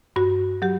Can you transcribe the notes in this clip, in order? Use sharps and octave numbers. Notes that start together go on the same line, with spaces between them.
G2 F#4
F#3 G4